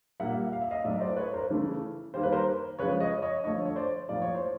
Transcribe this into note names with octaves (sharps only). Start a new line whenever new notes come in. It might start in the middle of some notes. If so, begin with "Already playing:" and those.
A#2 G3 A#3 E5 F#5
F5
E5
D#5 F5
A2 F#3 A3 D5 E5
D#5
C5 D5
B4 C#5
A#4 C5
C#3 E3 A3
D#3 G3 A#3 C5
B4
A#4 C5
C#3 F3 G#3 B4 C#5
C#5 D#5
C#5 D#5
D3 F3 A3 C#5 D#5
C#5
C5 D5
A2 F3 A#3 D5
C#5
C5